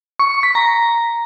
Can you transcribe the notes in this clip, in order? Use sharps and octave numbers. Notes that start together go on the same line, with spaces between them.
C#6
C#6
B6
A#5